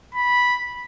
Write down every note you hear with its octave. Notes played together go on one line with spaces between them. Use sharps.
B5